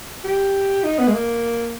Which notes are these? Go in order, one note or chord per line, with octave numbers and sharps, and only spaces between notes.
G4
D#4
B3
G#3
A#3